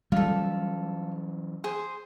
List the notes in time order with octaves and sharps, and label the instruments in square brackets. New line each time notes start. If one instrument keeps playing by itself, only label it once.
[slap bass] E3 F#3 C#4 [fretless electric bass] G3 [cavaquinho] F4 A4
[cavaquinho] G#4 C5